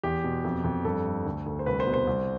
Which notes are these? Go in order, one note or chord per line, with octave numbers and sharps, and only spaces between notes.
E2 G4
B2
F2
F2
G2 A4
G2
D2
D2
C5
C2 B4
C5
B2
C5
C2